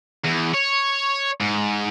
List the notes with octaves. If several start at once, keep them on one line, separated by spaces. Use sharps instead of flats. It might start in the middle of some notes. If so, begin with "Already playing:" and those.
E2
C#5
G#2